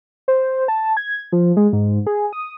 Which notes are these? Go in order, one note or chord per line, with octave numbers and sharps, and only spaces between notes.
C5
A5
G#6
F3
G#3
G#2
G#4
D#6